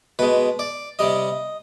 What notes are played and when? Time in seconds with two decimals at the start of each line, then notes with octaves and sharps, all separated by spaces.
0.19 B2 G#3 B4
0.59 D5
0.99 C3 G3 D#5